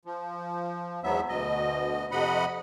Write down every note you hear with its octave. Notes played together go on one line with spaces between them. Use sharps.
F3
E2 G#2 F#3 B3 E5
D2 B2 D#5
F2 C3 D#5 F#5 B5